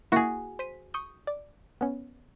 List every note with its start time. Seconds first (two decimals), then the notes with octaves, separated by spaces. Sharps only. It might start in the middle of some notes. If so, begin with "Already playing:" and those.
0.12 A#3 E4 F#4 G#4
0.59 C5 B6 D#7
0.94 C#6 D#6 G6
1.27 D5
1.81 B3 C#4